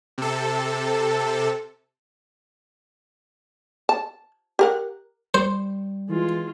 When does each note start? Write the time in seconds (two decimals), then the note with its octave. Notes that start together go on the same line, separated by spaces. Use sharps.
0.18 C3 A4
3.89 A5
4.59 G4 A#4 F#5
5.34 G3 C5
6.10 E3 G#3 F4